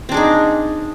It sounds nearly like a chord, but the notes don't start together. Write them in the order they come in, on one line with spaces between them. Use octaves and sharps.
C4 D4 G#4 D#4